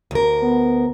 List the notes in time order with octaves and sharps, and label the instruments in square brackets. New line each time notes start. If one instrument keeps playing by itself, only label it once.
[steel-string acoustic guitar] D2 A#4
[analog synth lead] B3